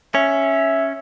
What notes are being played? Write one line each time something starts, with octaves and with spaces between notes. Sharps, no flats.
C#4 E5